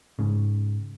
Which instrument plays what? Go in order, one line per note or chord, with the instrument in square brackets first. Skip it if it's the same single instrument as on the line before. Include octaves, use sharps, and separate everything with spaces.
[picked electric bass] G#2 C#3